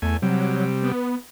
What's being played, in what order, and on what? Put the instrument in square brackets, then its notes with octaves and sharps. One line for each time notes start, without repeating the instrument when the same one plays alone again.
[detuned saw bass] E2 [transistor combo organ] A3 G#5
[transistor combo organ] C3 G3 [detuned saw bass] F#3
[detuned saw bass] B3